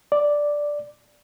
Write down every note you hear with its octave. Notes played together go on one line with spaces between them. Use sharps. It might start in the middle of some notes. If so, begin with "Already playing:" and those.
D5